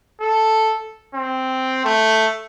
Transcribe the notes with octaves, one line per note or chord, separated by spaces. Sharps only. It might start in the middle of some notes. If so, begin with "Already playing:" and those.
A4
C4
A3